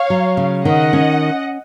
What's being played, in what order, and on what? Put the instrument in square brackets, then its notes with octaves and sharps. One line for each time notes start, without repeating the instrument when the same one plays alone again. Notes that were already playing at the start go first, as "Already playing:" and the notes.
Already playing: [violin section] C#5 F5
[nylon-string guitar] F#3
C#3
[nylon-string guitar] D#3 [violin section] D#5 F#5
[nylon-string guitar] C#4